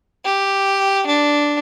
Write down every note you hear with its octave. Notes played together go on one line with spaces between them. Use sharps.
G4
D4